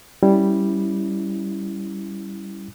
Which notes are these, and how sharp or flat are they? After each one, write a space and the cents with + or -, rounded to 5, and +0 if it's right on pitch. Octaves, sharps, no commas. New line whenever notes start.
G3 +0 C#4 +0 E4 +0